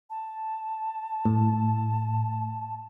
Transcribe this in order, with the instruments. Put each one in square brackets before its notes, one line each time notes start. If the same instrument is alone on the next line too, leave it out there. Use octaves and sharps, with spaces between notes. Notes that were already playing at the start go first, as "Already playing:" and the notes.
[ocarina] A5
[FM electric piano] A2